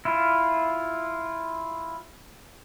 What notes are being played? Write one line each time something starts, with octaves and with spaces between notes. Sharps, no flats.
E4 F4